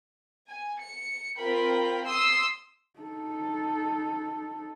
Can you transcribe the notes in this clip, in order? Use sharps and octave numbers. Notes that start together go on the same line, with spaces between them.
G#5
C#7
C4 F4 A#4 G5 B5
C6 D#6 E6 C7
D#4 A4